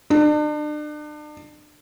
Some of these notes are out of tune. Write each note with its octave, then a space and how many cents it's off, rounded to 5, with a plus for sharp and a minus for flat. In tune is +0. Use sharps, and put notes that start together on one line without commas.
D4 +35